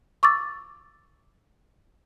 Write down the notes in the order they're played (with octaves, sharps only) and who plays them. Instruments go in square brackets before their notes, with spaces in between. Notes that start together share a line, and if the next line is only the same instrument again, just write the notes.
[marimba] C#6 D6 E6 A6